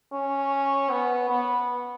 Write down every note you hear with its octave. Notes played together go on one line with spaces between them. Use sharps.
C#4
B3
B3